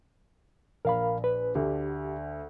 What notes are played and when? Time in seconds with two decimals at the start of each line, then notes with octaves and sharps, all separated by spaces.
0.85 A#1 A#4 F5 B5
1.24 B4
1.55 D2 D3 G4